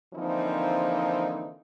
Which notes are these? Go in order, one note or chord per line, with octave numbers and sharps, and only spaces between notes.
D3 E3 F3 A#3 C4 D#4